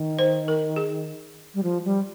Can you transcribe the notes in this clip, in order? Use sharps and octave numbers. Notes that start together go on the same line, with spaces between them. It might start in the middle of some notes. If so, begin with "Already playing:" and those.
Already playing: D#3
C5
A#4
G#4
G3
F3
G3